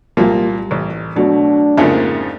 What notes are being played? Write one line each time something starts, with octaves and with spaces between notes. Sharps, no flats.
C2 A#2 F3 G3 A#3
A1
B2 F#3 A3 D4
F2 G#2 C#3 A#3 E5